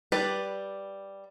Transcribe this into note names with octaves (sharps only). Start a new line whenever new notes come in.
G3 B4 D5